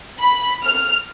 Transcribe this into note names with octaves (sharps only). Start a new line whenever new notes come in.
B5
F6